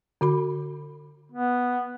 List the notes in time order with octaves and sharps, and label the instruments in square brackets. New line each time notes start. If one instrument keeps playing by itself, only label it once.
[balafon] D3 F#4 B5
[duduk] B3